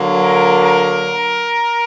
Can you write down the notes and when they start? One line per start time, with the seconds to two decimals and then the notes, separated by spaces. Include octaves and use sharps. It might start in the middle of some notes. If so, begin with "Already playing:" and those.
Already playing: D3 F#3 A#3
0.23 A#4
0.64 A#4